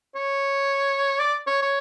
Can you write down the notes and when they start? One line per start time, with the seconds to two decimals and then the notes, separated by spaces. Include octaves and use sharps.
0.15 C#5
1.19 D5
1.47 C#5
1.62 C#5